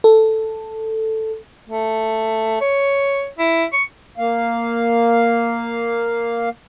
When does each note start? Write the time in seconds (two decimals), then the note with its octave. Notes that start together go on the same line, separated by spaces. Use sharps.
0.04 A4
1.69 A3
2.61 C#5
3.39 E4
3.73 C#6
4.18 A#3 F5